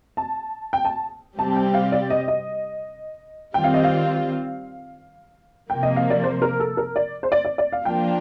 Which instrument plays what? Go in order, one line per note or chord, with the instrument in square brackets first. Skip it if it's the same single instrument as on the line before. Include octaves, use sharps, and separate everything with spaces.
[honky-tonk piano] A5
G5
A5
[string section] C3 G3 C4 G4 [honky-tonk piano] A5
[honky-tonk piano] G5
F5
D5
D#5
D#5
[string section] D#3 G3 C4 F4 [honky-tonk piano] G5
[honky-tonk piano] F5
D#5
F5
[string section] C3 F3 A#3 [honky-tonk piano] G5
[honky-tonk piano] D#5
F5
D5
C5
A#4
A4
A#4
D5
C5
D5
D5
D5
F5
[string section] F3 A#3 D4 F4 [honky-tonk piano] G5